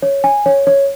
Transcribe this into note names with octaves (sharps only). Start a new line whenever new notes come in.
C#5
G#5
C#5
C#5